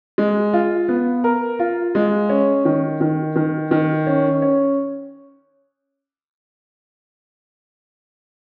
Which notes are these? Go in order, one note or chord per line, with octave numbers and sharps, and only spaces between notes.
G#3
F4
B3
A#4
F4
G#3
C#4
D#3
D#3
D#3
D#3
C#4
C#4